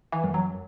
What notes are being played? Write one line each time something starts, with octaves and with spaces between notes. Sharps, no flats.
E3
F#2
F#3